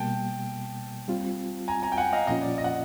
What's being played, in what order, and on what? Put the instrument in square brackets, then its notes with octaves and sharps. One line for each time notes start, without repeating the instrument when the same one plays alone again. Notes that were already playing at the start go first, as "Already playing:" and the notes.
Already playing: [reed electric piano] B2 G3 A#3 [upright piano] G5 A5
[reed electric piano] G3 C4 F4
[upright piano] G#5 A#5
G#5 A#5
G5
F#5 G#5
D#5 F5
[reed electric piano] A#2 F3 A#3 C#4 F4 [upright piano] D#5
[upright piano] D5
D#5
F#5